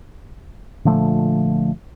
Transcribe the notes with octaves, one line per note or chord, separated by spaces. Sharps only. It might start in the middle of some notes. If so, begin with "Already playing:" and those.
A#2 D3 F3 A3